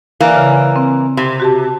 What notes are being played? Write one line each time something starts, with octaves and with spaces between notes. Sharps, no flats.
E3 A#3 D5 G#5
C#3
C4
C3
F#4 G4 A5